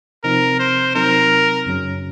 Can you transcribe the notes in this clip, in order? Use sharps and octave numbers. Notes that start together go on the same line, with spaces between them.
C3 F3 C4 D#4 A#4
C5
C3 F#3 C4 D#4 A#4
F#2 C#3 F#3 C#4